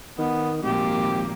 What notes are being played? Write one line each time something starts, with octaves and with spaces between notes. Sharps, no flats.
D#3 B3
G#1 A#2 F3 A#3 G4